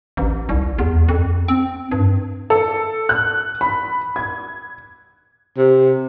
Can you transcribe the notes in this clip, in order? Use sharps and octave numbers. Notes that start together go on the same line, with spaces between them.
A1
C2
E2
F2
C4
G2
A4
F#6
B5
G#6
C3